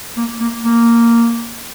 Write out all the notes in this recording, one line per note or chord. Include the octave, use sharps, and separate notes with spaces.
A#3
A#3
A#3